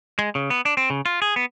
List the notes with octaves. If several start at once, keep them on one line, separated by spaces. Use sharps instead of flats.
G#3
C#3
B3
D4
C4
C#3
F4
G#4
B3